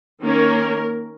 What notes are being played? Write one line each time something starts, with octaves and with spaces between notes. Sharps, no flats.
D#3 A#3 C#4 A#4